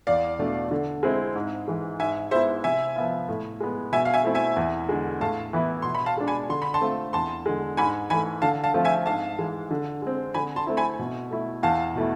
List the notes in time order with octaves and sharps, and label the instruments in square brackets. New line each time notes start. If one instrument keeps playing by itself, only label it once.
[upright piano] E2 [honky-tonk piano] D5 F5
[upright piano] B2 A3 D4
D3
G#3 C4 E4
G#2
E3 G#3
[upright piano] G#2 [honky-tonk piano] E5 G#5
[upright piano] G#3 B3 E4 [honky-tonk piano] C5 E5
[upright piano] C3 [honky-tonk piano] E5 G#5
[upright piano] F3 B3 F4
A2
G#3 B3
[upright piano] B2 [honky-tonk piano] E5 G#5
[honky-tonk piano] F5
E5 G#5
[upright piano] A3 C4 E4
[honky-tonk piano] E5 G#5
[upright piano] E2
D3 G#3
[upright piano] A2 [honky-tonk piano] F5 A5
[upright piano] E3 B3 E4
[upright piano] B2 [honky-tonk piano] C6
[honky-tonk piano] B5
F5 A5
[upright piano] G#3 D4
[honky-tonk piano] G#5 B5
[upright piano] D3 [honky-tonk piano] C6
[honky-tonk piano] B5
A5 C6
[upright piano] A3 C4 F4
[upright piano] E2 [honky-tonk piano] A5 C6
[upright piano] D3 G#3
[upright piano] G#2 [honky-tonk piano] G#5 B5
[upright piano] E3 A3 [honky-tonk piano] G#5 B5
[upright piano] D3 [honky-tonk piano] F5 A5
[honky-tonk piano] F5 A5
[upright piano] F3 A3 C4 F4
[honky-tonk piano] E5 G#5
[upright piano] G#2 [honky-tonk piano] F5 A5
[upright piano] E3 G#3
D3
G#3 C4
[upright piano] D3 [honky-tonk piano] G#5 B5
[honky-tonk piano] A5 C6
[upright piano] A3 C4 E4
[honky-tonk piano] G#5 B5
[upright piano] B2
A3 E4
[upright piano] E2 [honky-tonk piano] F5 A5
[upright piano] B2 A3 E4